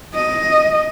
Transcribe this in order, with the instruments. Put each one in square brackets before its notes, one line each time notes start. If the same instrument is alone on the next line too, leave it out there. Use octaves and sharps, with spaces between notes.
[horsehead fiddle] D#5